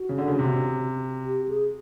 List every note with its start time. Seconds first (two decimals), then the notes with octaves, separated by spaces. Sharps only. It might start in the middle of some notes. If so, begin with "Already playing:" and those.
Already playing: F#4
0.09 C#3
0.18 D3
0.28 C#3
0.39 C3
1.26 G4
1.49 G#4